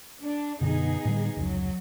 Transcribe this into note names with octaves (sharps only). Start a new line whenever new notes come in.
D4
F#2 B2 D3 B3 D#4 G#4
A2 D3 G3
F1 C#2 F#3